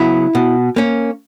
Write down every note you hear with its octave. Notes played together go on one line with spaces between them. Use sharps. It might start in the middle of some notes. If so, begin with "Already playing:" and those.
Already playing: C#3 F#3 B3 E4
B2
A#3 C#4